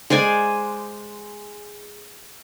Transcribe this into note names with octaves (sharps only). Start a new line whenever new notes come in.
G#3 C5 D5 G#5